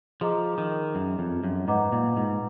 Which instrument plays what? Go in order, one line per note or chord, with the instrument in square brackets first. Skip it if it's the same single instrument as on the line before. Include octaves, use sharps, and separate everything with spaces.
[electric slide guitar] F3 [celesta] G#4 D#5 A#5 D6
[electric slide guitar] D#3
F#2
F2
F#2
[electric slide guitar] G#2 [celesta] B4 D#5 F#5 A#5 D6
[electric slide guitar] A#2
G#2